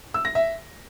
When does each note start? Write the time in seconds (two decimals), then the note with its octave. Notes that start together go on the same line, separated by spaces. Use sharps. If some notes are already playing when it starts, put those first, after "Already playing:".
0.14 E6
0.25 A#6
0.35 E5